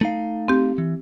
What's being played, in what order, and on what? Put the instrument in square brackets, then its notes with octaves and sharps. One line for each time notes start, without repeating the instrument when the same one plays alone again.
[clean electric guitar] A3 D#4 F5
[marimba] C4 G4
[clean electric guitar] E3